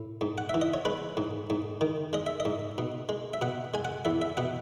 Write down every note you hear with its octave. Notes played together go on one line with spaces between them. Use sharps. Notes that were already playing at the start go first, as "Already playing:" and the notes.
Already playing: A2
G#2
F#5
E3 E5
D#5
C#5
G#3 B4
G#2
G#2
D#3
G#3 D#5
E5
D#5
G#2
B2
G#3
E5
B2 F#5
G#3 G#5
F#5
E2 E5
E5
B2 F#5